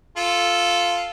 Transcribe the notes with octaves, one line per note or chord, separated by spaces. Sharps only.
F4 A4